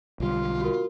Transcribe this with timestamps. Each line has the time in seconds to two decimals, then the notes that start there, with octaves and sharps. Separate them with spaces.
0.20 B1 D3 G3 F4
0.61 F#4 A#4